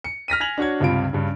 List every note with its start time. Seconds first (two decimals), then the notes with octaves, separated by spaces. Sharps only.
0.04 C#7
0.28 F6 A#6 B6 D#7
0.40 G#5 G#6 A#6 F7 F#7
0.58 D4 F#4 C#5 G#6
0.80 C#2 G2 C3 F4 B5 D7
1.13 G2 C#3